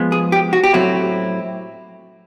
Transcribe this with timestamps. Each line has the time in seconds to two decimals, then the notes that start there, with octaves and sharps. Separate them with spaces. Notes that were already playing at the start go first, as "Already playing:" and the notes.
Already playing: F3 G#3 B3
0.12 G#4
0.32 G4
0.53 F#4
0.64 G4
0.73 A2 F#3 A3 C4 E4 F#4